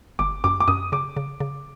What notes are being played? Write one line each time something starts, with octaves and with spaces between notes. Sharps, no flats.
G1 D6
F#2 D6
D6
F#2 D#6
C#3 D6
C#3
C#3